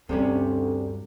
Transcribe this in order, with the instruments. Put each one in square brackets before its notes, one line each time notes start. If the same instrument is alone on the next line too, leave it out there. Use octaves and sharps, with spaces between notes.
[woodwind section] D2 [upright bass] G2 [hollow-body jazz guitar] C3 G3 C#4